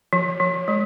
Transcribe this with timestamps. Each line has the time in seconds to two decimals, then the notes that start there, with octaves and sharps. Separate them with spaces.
0.13 F3
0.40 F3
0.68 G#3